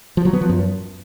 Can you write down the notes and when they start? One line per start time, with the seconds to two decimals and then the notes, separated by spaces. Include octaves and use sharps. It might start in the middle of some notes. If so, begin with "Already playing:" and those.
0.17 F3
0.25 F#3
0.33 B3
0.41 F3
0.49 F#2